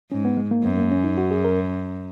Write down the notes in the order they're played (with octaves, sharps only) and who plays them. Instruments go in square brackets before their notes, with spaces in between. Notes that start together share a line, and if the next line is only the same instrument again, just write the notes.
[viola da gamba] G#2 [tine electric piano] C#4
[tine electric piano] B3
G#3
A#3
[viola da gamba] F#2 [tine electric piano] B3
[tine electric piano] A#3
C#4
D#4
F#4
G#4
A#4